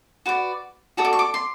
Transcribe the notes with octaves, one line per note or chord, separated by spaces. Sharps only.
F#4 B4 D5
F#4 A4 D5 D#6
D6
C#6
D6
C6